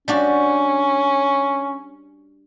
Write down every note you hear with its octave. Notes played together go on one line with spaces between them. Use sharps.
G3 C#4 D4 F#4